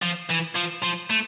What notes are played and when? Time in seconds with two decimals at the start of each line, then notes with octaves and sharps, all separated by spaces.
0.02 F3
0.30 E3
0.56 F3
0.83 F3
1.10 A3